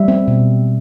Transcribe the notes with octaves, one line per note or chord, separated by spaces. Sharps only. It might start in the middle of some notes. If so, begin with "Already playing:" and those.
Already playing: G3 E5
C4
B2